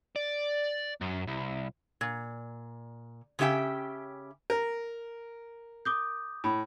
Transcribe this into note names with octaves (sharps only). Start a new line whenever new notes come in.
D5
F#2
C2
A#2
C#3 C#4 G4 E5 G5
A#4
D6 D#6 G6
A2 B5